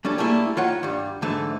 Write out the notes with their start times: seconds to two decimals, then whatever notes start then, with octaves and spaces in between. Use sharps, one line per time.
0.05 G3 C#4 D4 A4
0.18 G3 A3 A#3 E4 G#4
0.57 D#3 F4 C#5 F#5 G5
0.83 G2 G3
1.22 G#2 D3 E3 G#3 A3